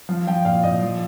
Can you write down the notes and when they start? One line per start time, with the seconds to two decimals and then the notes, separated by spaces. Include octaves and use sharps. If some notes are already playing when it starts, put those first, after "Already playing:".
0.09 F3 F5
0.27 F3 G5
0.45 A#2 F5
0.63 A#2 D#5
0.82 F3